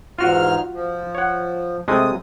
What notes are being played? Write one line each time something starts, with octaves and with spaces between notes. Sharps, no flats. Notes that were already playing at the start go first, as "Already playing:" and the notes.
E2 G#2 F4 F#4 F6
F3
C#5 F#5
C3 G#3 A3 D#6